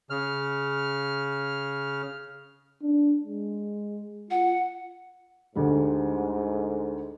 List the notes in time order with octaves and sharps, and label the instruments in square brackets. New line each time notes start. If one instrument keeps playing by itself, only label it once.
[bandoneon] C#3 F6
[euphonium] D4
G#3
[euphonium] F4 [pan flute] F#5
[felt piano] D2 D3 G3 [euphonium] G#2